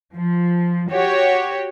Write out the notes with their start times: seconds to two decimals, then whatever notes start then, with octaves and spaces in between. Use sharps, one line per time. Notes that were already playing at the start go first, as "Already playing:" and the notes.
0.14 F3
0.91 F#4 G4 C#5